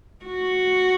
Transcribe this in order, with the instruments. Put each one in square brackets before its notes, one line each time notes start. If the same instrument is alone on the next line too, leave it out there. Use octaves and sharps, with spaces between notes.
[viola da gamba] F#4